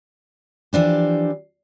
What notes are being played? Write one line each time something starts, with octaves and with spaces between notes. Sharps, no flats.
E3 F3 D4 G4